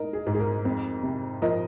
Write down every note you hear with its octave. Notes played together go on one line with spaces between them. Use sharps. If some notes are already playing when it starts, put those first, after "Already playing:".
Already playing: D#4 A#4
G#4
G#2
G#4
A#4
F2
C3
F3 A#4 D#5